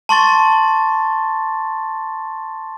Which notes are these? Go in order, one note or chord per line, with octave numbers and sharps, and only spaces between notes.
A5 C6 C#6 A6